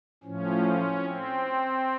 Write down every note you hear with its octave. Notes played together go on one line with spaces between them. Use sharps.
A2 F3 C#4
C4